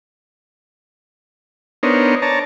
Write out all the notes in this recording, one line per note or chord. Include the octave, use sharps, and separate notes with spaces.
B3 D4 D#4 A#4 C5 C#5
C#5 D5 A5 A#5